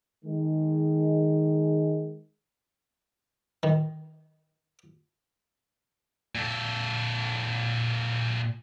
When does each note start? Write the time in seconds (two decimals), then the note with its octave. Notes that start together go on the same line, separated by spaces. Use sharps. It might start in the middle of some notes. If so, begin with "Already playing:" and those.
0.24 D#3 G#3
3.63 D#3
6.35 A#2 A4